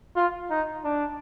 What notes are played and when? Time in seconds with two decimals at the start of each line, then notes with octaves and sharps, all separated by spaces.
0.16 F4
0.50 D#4
0.84 D4